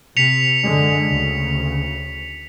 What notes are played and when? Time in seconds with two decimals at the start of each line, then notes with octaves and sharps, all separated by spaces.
0.17 C3 B6 C#7 F7
0.63 F#2 D3 G#3
1.07 D2 C#3